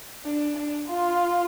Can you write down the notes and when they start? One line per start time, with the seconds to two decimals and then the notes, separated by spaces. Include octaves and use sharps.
0.24 D4
0.56 D4
0.88 F4